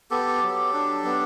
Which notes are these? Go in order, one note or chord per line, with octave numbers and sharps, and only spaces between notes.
B3 G4 A4
F#3
D4
B3